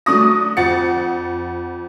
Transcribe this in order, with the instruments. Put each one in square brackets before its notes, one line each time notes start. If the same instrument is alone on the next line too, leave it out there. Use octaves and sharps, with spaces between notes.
[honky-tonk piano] F#3 A3 D4 C#6 D#6 A#6
F2 F#5 A6 C#7